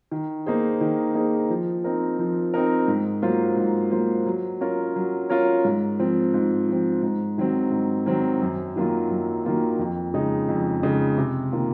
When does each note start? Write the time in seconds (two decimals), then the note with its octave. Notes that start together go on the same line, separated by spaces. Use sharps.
0.11 D#3
0.46 A#3 D#4 G#4 C5
0.81 D#3
1.15 A#3 D#4 G#4 C5
1.50 F3
1.84 C4 D#4 A#4
2.19 F3
2.54 C4 D#4 A#4
2.88 G#2
3.22 F#3 A#3 F4 C5
3.57 G#2
3.91 F#3 A#3 F4 C5
4.26 F#3
4.61 C#4 F4 A#4 C#5
4.96 F#3
5.29 C#4 F4 A#4 C#5
5.65 G#2
5.99 F3 C4
6.34 G#2
6.68 F3 C4
7.03 G#2
7.38 D#3 F#3 C4
7.71 G#2
8.06 D#3 F#3 C4
8.41 F#2
8.76 D#3 F#3 A#3 F4
9.10 F#2
9.45 D#3 F#3 A#3 F4
9.79 F2
10.14 C#3 G#3 D#4
10.49 F2
10.83 C#3 G#3 D#4
11.18 C3
11.52 D#3 A#3 F4